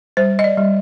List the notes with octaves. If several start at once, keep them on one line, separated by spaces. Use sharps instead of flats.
G3 C5
D#5
D5
G3